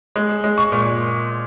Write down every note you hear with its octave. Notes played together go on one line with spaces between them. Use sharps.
G#3
G#3
C#6
A#2